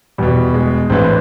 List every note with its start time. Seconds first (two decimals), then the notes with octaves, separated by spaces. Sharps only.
0.18 E2 B2 G3
0.54 G#3
0.90 A1 A2 E3 C4 D4